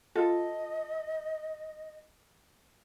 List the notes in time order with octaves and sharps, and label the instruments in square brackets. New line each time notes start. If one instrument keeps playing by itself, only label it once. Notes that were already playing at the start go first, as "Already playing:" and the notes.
[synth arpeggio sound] F4 [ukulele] A4 [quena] D#5